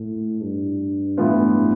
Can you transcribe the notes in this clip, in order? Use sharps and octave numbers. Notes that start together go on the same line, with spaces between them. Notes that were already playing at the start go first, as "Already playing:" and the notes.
Already playing: A2
G2
A2 E3 B3 F4